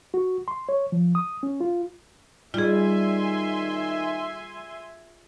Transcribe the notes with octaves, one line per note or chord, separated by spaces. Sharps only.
F#4
C6
C#5
F3
D#6
C#4
F4
D#3 G3 F4 G#4 E5 G#5 C6